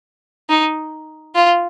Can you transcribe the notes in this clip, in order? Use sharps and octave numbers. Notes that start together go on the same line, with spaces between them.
D#4
F4